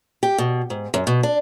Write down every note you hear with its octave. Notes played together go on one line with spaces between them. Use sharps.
G4
B2
G#2
F#2
B2
D4